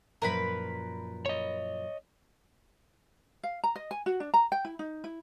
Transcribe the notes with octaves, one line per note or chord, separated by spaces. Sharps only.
F#2 A#2 F3 A#4 B4 B5
C#5 D#5
F5
A#5
D#5
G#5
F#4
D4
A#5
G5
E4
D#4
E4